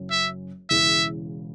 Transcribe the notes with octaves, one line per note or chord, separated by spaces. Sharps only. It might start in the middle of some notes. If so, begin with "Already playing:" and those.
Already playing: F#1 F#2 F#3 C#4
E5
E1 E2 C#3 E3 C#4 E5